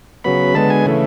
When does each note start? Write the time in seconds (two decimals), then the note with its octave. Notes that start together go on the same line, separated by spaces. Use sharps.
0.24 C#3 F#3 B3 B5
0.54 D3 G#3 B3 A5
0.70 G#5
0.86 C#3 E3 A3